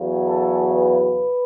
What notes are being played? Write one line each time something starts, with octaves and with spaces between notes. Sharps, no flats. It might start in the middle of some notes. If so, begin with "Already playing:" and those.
Already playing: E2 C#3 F#3
A4
B4